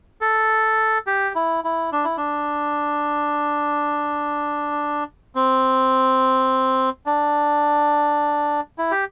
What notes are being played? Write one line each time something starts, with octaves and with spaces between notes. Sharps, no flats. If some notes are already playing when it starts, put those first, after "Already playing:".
A4
G4
E4
E4
D4
E4
D4
C4
D4
E4
G4